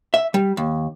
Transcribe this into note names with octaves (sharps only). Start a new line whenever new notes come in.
E5
G3
D#2